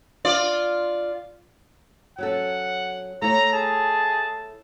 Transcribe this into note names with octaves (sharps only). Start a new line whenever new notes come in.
F4 D5
F#3 C#4 A4 F#5
A3 E4 C#5 A#5
G#4 A5